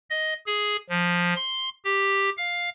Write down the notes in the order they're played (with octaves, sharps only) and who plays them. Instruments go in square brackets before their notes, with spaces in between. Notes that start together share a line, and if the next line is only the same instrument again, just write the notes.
[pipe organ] D#5
G#4
F3
C6
G4
F5